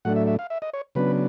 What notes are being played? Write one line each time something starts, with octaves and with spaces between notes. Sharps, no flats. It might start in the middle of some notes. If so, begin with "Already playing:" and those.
A2 F#3 A3 D4 F#5
E5
E5
F5
E5
D#5
C#5
C#3 F#3 B3 D4 B4